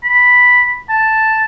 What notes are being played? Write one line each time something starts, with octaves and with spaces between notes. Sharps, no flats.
B5
A5